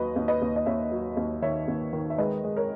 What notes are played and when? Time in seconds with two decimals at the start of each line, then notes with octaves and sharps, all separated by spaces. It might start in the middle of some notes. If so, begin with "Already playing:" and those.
Already playing: D#2 F#3 B4 D#5
0.16 D#2
0.28 B4 D#5
0.42 D#2
0.56 D#5
0.66 D#2 C#5 E5
0.92 F#3
1.17 D#2
1.42 D#3 C#5 E5
1.68 D#2
1.93 D#3
2.10 E5
2.18 G#3 B4 D#5
2.44 G#3
2.56 A#4 C#5